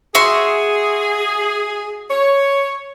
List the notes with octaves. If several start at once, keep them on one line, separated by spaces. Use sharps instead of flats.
F#4 G#4 E5 C6
C#5